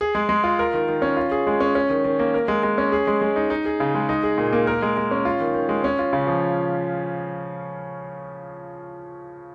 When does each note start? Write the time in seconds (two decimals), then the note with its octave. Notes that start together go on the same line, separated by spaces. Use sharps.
0.01 G#4
0.15 G#3
0.29 G#3
0.44 F4
0.59 A#4
0.74 D#3
0.88 D#3
1.02 C#4
1.17 F4
1.32 G#4
1.47 G#3
1.60 C#4
1.75 C#4
1.90 D#3
2.04 D#3
2.19 A#3
2.34 A#4
2.48 G#3
2.63 G#3
2.78 C#4
2.92 G#4
3.07 G#3
3.22 G#3
3.36 D#4
3.50 D#4
3.66 G#4
3.80 C#3
3.95 G#3
4.09 D#4
4.23 G#4
4.38 A#2
4.53 A#3
4.67 A#4
4.82 G#3
4.97 G#3
5.11 C#4
5.25 F4
5.40 D#3
5.54 D#3
5.69 G#3
5.84 C#4
5.99 F4
6.13 C#3
6.27 F3